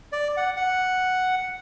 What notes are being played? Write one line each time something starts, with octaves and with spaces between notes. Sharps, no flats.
D5
F#5
F#5